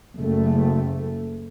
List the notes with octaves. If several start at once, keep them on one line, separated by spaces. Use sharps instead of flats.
F#1 A3